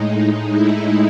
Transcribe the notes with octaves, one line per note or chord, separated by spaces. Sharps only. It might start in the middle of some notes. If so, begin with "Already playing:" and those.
Already playing: A2 G#3 D#4
E4